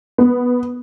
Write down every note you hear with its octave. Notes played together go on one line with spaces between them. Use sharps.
B3